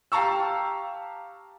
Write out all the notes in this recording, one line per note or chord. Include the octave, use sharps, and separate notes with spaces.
G4 F5 A5 A#5 C#6 E6